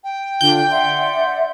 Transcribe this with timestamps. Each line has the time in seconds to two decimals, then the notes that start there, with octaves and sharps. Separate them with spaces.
0.04 G5
0.41 D3 D4 F4 G6
0.71 D5 E5 F#5 C6